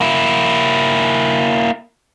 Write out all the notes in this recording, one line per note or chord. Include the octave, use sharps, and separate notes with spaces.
A#3 E4